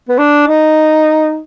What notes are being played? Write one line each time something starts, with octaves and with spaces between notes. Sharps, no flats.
B3
D4
D#4